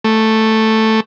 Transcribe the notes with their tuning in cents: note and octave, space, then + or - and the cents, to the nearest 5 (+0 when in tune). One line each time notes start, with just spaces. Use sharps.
A3 +0